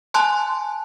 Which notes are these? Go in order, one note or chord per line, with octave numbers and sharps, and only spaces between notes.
G#5 A5 C6 F#6